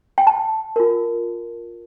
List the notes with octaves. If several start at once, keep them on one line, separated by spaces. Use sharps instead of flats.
G5
A5
F4 A#4